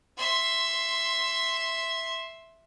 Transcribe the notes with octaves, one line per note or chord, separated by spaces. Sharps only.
E5 C6